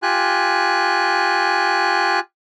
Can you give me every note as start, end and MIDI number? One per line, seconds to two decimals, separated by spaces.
0.03 2.20 65
0.03 2.20 67
0.03 2.20 80
0.03 2.20 90